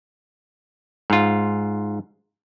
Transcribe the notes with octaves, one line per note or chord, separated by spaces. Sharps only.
G#2 F4